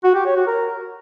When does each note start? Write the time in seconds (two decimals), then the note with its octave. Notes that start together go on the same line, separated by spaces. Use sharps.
0.04 F#4
0.15 G4
0.26 C#5
0.36 F#4
0.47 A#4